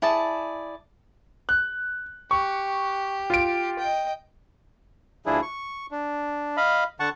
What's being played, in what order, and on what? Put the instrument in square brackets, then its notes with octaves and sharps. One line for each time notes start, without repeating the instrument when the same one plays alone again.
[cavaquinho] E4 G#4 D5 A5
[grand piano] F#6
[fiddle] G4 [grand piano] C#6
[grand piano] F4 D7
[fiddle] D#5 G5
[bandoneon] D2 F3 D4 E4 G#4
C#6
D4
D#5 F5 B5
D3 F#5 A5 C#6